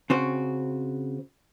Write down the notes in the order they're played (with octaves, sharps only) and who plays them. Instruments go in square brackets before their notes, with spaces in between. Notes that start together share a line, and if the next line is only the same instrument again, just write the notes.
[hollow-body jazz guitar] C#3 C4 F#4